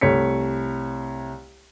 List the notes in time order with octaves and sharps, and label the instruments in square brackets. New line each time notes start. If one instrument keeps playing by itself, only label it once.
[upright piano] C2 A3 C#5 B6 C#7